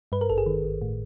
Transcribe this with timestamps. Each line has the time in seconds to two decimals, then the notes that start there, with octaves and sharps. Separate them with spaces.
0.12 G2 B4
0.21 A#4
0.29 G#1 A4
0.38 G#4
0.46 D#3
0.64 G#1
0.81 A2